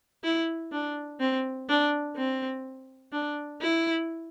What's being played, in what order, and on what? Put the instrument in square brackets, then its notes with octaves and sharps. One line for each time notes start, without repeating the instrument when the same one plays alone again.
[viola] E4
D4
C4
D4
C4
D4
E4